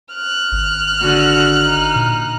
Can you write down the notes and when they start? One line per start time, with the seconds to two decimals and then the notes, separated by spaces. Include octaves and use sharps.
0.13 F6 F#6
0.52 G#1
1.01 D3 F#4
1.64 D#4
1.95 A#2